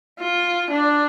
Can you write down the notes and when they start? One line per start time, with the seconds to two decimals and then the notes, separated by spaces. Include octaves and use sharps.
0.20 F4
0.71 D4